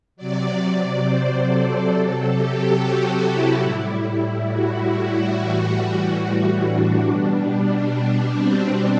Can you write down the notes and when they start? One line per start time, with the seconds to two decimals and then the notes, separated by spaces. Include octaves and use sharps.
0.16 C3 F#3 D5
1.03 C5
1.45 A4
1.89 C3 F#3
2.31 G4
2.75 F#4
3.18 E4
3.60 A2 G3 E4
4.47 F#4
5.33 A2 E3 G3 F#4
6.62 D4
7.05 B2 G3
8.34 C4